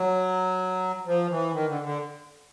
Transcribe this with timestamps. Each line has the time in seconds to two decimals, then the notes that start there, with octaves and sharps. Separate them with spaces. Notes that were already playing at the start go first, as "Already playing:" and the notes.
Already playing: F#3
1.06 F3
1.30 E3
1.52 D#3
1.68 D3
1.84 D3